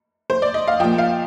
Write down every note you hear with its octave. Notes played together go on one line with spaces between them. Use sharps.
C5
D5
D#5
F5
A#2 F3 G5
F5